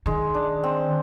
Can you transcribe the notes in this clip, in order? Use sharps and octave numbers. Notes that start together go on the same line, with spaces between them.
D#3 G#3
D4
C4